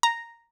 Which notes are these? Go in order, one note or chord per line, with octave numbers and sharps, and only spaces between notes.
A#5